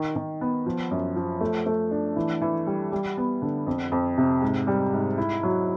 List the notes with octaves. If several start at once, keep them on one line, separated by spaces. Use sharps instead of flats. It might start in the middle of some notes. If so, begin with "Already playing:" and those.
Already playing: D#3
D#3
B3
F3
F#2
F3
A3
A3
D4
E3
E3
G3
G3
B3
D3
F2
F2
C3
G#2
G3
G#2
E4
F#3